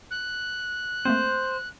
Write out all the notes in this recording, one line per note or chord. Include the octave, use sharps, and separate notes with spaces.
F#6
A3 A#3 C4 C5